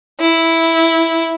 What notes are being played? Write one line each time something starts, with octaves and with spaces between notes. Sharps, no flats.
E4